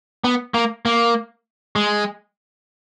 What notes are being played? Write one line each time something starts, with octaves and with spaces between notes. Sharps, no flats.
B3
A#3
A#3
G#3